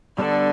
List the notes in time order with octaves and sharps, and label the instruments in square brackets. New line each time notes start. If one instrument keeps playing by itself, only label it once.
[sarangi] D3 [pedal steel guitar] G3 B3 D4 A4 D5